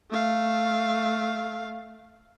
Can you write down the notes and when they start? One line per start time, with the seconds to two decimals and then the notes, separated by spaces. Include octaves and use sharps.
0.10 A3 F5